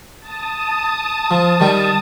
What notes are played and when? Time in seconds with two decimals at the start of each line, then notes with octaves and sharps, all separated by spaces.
0.20 A5 D#6
1.31 F3
1.60 D#3 G3 G5